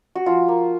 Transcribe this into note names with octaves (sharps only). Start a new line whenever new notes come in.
F#4
F3 F4
A#3